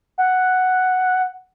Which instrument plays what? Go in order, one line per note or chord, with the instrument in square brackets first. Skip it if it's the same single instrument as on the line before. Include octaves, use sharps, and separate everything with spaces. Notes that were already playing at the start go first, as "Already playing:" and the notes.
[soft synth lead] F#5